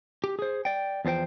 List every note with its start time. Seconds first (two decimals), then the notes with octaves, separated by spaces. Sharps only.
0.24 G4
0.39 G#4 C5
0.65 D5 G5
1.05 E2 F3 F4 C5 G5